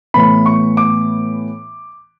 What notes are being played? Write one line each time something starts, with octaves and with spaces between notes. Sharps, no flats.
A2 E3 B3 B5
C#6
D6